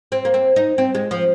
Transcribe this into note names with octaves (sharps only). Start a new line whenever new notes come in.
C4
A#3
C4
D#4
C4
G#3
F3